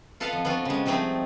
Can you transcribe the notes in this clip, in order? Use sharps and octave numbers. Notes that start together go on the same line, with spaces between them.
F4 A4 B4 D#5 F5 F#5
F2
B3 C4 D4 F4 F#4
C#3 G#3
F3 G3 A3 C4 D#4 G#4